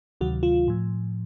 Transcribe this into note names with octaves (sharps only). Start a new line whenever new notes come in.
D2 C3 D#3 F#3 F#4
F4
A2 F3